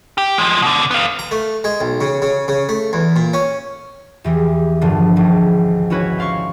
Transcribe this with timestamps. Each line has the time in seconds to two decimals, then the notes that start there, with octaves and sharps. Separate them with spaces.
0.18 G4
0.38 F3 G#3
0.62 B2 D3
0.91 B3 F5
1.19 A#5
1.31 A3
1.64 G#3
1.81 B1
2.01 C#3
2.22 C#3
2.48 C#3
2.69 A3
2.93 E2
3.16 A#2
3.33 C#4
4.24 E2 E3 G4
4.81 A#1 G2 D3 F3
5.16 G#1 C#2
5.90 C#4 E4 F#4 B4 C#5
6.17 C5 D5 F5 C6 C#6